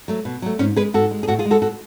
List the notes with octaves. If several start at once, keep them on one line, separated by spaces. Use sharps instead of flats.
F#3 A3
B2
F#3 A3
G#2 C#4
G#3 G#4 B4
G#2 F#4 A4
G#3
G#4
A2 F#4 A4
F4 G#4
G#3
F#4 A4
A2 F#4 A4